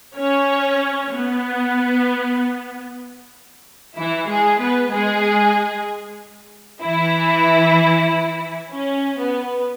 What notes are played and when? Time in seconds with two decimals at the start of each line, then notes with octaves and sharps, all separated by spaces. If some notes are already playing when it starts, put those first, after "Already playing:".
0.17 C#4 C#5
1.12 B3
3.97 E3 E4
4.28 G#3 G#4
4.60 B3 B4
4.92 G#3 G#4
6.82 E3 E4
8.71 C#4
9.19 B3